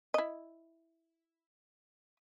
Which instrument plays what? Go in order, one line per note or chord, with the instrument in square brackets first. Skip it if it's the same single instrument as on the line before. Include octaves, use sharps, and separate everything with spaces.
[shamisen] E4 D#5